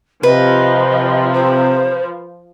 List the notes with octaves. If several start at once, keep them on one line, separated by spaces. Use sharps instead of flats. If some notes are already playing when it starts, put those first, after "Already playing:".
C3 F3 B4 D#5
C5